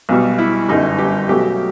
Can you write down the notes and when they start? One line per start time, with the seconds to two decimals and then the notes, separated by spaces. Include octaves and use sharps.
0.09 B1 B2 G3
0.38 E4
0.69 G1 F#2 D3 G3 D#4
0.98 G4
1.29 B1 B2 F#3 A3 G4